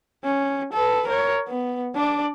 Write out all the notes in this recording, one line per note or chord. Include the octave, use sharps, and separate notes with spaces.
C#4
A4 B4
A#4 C#5
B3
D4 D5